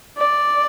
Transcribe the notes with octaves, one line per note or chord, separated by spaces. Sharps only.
D5